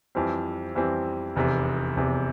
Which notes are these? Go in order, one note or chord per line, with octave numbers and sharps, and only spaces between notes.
F2 E3 G3 C4
F2 E3 G3 C4
F1 E2 C3
F1 E2 C3